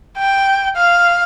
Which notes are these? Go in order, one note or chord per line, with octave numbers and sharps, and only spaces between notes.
G5
F5